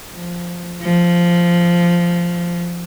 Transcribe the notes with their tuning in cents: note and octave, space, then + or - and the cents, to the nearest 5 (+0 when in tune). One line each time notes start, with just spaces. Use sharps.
F3 +0
F3 -5